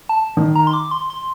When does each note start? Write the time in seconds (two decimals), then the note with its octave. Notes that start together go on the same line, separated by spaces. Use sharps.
0.09 A5
0.37 D#3
0.55 A#5
0.67 C6
0.73 D6
0.91 C6
1.10 C6